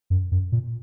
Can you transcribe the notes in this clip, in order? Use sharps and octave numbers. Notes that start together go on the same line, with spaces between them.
F#2
F#2
A#2